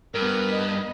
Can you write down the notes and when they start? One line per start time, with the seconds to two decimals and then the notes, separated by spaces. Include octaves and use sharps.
0.15 G2 B3 A#4 B5
0.51 D#5